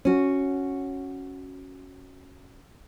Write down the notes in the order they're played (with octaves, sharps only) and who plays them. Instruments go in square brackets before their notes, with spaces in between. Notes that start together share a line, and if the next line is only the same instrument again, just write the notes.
[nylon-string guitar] C#4 F#4